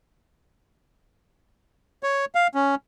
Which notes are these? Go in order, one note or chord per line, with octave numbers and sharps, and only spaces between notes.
C#5
F5
C#4